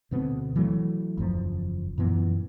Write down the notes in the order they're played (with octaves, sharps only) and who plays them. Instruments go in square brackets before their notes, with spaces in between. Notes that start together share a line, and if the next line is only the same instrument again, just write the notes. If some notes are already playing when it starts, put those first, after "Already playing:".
[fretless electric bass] D2 B2 B3 C4
E3 F#3 A3
F#1 E2 F3
F#2 A#2 E3 B3